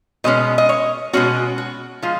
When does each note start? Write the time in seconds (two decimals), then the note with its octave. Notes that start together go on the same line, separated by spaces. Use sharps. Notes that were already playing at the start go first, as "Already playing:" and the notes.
0.24 B2 G#3 C#4 D#5
0.58 D#5
0.69 C#5
1.13 B2 G#3 C#4 F#4
1.58 F#4
2.02 F3 G#3 F4